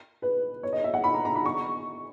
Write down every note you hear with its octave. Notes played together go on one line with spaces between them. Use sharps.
B4
C#5
D#5
E5
F#5
B5
A#5
A#5
B5
C#6